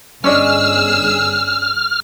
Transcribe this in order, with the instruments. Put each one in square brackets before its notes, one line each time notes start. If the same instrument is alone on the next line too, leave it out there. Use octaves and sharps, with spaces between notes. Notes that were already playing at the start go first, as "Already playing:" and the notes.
[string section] G1 G#4 E6 [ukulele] C#4 D4 D#5 [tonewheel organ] F6